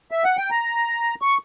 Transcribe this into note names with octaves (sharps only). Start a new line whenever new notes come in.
E5
F#5
G5
A#5
C#6